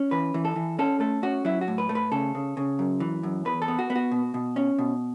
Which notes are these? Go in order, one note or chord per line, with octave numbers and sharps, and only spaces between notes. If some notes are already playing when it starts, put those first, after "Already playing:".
Already playing: C#4
E3 B4
E3
A4
E3
C#4 A4
A3 A4
C#4 F#4
F#3 E4
F#4
A2
B4
A3
B4
C#3 A4
C#3
C#3
F#2
E3
F#2
E2 B4
A4
B3
F#4
B3
F#4
B2
B2
C#4
B2